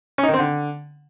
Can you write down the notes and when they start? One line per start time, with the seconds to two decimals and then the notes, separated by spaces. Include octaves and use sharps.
0.18 C#4
0.23 D#4
0.28 D#3
0.33 C4
0.39 D3